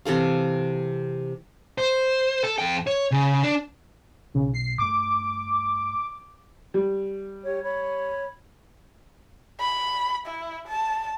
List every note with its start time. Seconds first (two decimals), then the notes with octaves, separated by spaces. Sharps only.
0.05 C3 E3 A4 F5
1.78 C5
2.44 A4
2.58 F2 G5
2.87 C#5
3.11 C#3
3.43 D4
4.34 B1 C#3
4.54 C7
4.78 G2 A3 D6
6.74 G3
7.44 G4 C#5
7.62 C#5 B5
9.60 B5
10.27 E4
10.68 A5